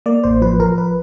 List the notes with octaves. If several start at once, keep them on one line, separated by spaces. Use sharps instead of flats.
A#3 D5
A1 C5
F3 B4
F3 A#4
B4